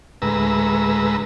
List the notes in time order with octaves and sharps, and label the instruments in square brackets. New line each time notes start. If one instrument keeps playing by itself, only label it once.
[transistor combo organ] D2 A2 G#3 B4 A#5 E6